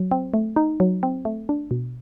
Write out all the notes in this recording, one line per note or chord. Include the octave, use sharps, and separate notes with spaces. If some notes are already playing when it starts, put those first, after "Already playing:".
Already playing: F#3
C4
A3
D#4
F#3
C4
A3
D4
B2